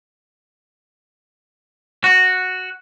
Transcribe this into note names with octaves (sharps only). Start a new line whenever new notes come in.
F#4